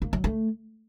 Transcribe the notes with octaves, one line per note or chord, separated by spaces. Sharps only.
A#3
F#3
A3